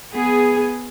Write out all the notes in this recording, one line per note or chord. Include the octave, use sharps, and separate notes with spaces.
B3 G#4